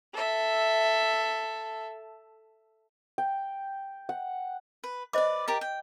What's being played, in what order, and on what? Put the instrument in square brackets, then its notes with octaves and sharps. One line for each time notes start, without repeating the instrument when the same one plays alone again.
[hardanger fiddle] A4 E5
[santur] G5
F#5
[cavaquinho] B4
[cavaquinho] B4 D5 [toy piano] C5 D#5 D6
[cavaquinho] G4 A#4 A5
G5